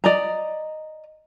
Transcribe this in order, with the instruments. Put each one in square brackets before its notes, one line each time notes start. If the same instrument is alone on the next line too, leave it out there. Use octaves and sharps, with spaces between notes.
[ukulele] D5 D#5 A#5